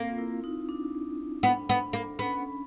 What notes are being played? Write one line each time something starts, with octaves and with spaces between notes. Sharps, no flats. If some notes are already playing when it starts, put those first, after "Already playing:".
Already playing: A#3 C4
F4
E4
D#4
D4
B3
B3
A#3
B3 C#4